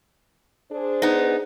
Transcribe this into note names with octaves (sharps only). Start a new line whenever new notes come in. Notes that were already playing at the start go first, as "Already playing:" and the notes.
D4 G#4 C5
B3 D#4